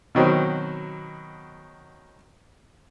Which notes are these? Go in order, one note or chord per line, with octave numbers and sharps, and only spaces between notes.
B2 D#3 F#3 C4